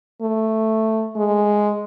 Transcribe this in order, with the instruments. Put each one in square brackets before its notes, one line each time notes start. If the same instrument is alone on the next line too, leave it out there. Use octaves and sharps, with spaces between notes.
[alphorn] A3
G#3